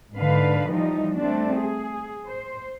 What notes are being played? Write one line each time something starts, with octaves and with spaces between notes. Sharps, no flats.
G#2 D3 B4 F5
E3 F3 G3 D#4
G3 A3 C4 D4
G#4
C5